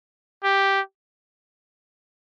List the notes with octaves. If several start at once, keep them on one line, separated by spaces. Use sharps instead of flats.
G4